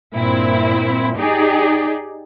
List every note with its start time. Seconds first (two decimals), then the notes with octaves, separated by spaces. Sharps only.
0.14 G2 A#2 C4 E4
1.16 D#4 G4 G#4 D5